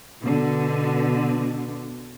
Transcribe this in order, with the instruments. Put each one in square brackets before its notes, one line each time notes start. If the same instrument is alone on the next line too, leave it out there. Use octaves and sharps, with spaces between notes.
[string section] B2 D3